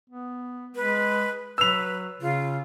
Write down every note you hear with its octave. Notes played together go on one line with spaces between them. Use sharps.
B3
G#3 B4
F#3 B4 E6 F7
C#3 F4